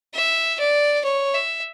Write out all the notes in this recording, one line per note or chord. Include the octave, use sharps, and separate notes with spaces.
E5
D5
C#5
E5